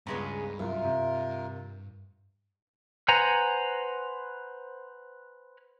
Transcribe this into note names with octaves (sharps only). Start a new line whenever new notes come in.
C#2 G2 C#3 G#3 B3 A#5
C2 F#2 F4 A#4 E5
C3
B4 C5 F#5 G#5 A#5